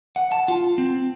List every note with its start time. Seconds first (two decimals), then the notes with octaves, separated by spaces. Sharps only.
0.16 F#5
0.32 A5
0.48 F4
0.78 C4